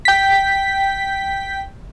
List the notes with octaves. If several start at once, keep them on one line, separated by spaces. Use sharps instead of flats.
G5 B6